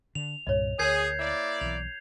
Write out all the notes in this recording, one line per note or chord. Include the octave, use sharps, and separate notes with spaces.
D3 F7
C2 G2 A#2 C#5 D#5
D2 G#4 A#4 C#5 G6 G#6 C7
A#3 E4 D5
B1 E3 F7